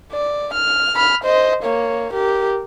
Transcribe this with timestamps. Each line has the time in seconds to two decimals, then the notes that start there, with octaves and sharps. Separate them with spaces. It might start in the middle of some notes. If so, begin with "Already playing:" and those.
0.12 D5
0.54 F6
0.95 B5 F6
1.24 C5 D#5
1.64 A#3 C#5
2.13 G4 A#4